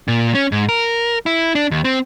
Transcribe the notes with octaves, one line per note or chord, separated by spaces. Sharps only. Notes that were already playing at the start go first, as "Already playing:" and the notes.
A#2
C#4
G#2
A#4
E4
D4
D#2
C4